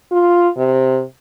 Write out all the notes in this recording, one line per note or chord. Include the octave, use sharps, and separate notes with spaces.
F4
C3